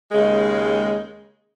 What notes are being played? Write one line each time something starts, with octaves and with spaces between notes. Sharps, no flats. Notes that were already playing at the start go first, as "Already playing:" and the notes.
D#2 C#3 G#3